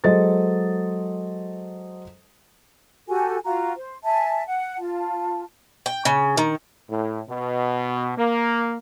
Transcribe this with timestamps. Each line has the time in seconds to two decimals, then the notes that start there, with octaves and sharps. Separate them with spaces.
0.04 F#3 G#3 A4 C5 D#5 A6
3.08 F#4 G4 A4 G#5
3.44 F4 F#4 A#5
3.74 C5
4.04 E5 G#5 A5
4.46 F#5
4.78 F4 A5
5.86 G5
6.05 C#3
6.37 D#3
6.90 A2
7.29 B2
8.18 A#3